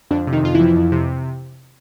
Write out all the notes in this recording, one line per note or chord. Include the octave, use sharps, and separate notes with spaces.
F2 D3 D4
C3
D#3 D#4
F2 F4
E3 E4
F3
F2
C3